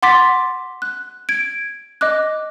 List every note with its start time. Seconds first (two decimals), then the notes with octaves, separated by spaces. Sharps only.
0.03 F#5 C6 D6 A6 B6
0.82 F#6
1.29 G#6 D7
2.01 D#5 D6 F#6